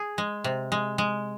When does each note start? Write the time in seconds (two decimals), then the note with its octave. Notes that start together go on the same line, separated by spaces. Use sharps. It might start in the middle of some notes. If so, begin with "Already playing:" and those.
Already playing: G#4
0.18 G#3
0.44 C3
0.72 G#3
0.98 G#3